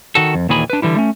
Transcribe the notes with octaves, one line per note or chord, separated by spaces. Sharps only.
D#3 F#4 A4
F2
D#2 A#2 D#3 E3 G#4 B5
D4 B4
D3 E3 G3 E4
A3 C#4